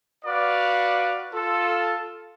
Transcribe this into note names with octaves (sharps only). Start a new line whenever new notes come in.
F#4 B4 D5 F5
F4 A4